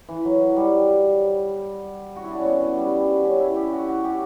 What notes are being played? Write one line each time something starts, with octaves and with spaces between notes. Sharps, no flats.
E3
F#3
G3
F#4
E4
D4
C#4
B3
G3
C#4
E4
G4
F#4
F#4
G4